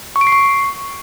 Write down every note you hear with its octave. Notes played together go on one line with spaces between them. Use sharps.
C#6
D7
C7
C#6